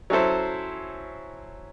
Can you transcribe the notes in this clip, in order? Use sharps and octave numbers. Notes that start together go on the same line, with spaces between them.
F#3 C#4 E4 A4 C5